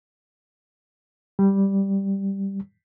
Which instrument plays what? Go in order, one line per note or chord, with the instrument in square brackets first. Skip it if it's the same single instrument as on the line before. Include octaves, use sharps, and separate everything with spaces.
[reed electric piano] G3